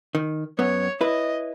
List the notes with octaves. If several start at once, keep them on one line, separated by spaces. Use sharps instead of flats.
D#3
F#2 B3 C#5
E4 B4 D#5